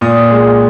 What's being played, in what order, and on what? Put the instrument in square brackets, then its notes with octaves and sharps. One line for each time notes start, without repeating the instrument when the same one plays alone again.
[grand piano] A#2 D#6
G#3